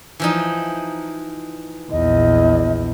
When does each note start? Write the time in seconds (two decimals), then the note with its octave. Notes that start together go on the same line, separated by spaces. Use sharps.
0.20 E3 F3 D#4
1.91 A#1 E2 D#5